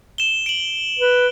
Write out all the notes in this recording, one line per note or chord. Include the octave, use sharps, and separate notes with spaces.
E7 G7
D7 F#7
B4